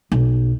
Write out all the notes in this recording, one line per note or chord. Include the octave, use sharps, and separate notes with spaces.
B1